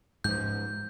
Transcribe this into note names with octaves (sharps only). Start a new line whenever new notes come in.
G#2 F3 G6